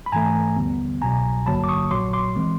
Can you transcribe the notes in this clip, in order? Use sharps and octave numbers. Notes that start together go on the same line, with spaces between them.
B5
G#2 E3 A3 G#5 A#5
D#2 D3 G3 B3
C2 B2 F#3 G#5 A#5
G#1 G2 D3 F#3 A#3 A5 B5
D6
C#6 D#6
A#1 A#2 F#3 C6 D6
C6 D6
E3 G#3 C4